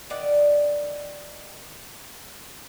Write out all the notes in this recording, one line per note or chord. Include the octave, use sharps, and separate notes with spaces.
D#3 D5 F#5